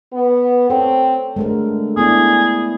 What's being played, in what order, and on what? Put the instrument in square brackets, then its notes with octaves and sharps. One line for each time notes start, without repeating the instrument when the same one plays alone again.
[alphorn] B3
[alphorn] C4 [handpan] A4 C#5
[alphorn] D3 [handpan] G#3 A3 A#4
[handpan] B3 E4 D5 [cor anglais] G#4